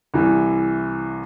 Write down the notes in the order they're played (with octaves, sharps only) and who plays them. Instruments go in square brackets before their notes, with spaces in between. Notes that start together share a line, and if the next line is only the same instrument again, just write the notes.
[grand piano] C2 E3